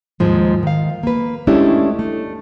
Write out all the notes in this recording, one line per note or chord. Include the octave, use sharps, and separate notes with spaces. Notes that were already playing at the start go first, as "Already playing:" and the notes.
D#2 G#2 F3 G#3
D#3 F5
A#3 B4
G#3 A3 C#4 D4 E4 G4
A3